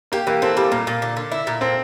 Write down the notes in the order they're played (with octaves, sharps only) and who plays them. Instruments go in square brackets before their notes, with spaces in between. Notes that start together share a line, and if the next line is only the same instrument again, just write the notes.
[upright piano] A#3 [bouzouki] G4
[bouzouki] E3 [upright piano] A#3
[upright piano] C4 [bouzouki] A4
[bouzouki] G3 [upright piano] A#3
[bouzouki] A#2 [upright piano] A#3
[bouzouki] A#2
D3
D3
E4
A#2
[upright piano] C4 [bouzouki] A4